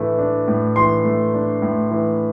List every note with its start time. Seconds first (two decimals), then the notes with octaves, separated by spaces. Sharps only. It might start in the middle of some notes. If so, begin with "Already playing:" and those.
Already playing: A2 E3 A3 D4
0.18 D4
0.48 A2
0.76 E3 C6
1.05 A3
1.34 D4
1.62 A2
1.91 E3